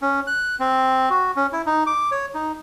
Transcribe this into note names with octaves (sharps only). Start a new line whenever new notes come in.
C#4
F#6
C4
F#4
C#4
E4
D#4
D6
C#5
D#4